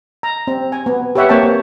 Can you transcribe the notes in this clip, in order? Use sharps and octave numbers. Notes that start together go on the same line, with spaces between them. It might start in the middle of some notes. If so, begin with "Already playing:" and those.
A#5
C4
G#5
B3
G4 B4 C#5 E5 F#5
A#3 C4 C#5 F#5 G5 A5